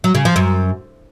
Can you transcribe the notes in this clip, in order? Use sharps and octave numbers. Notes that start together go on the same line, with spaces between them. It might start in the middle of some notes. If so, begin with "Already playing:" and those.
F#3
C#3
F3
F#2